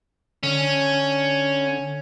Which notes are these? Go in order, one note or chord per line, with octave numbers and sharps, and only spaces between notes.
D3 C#4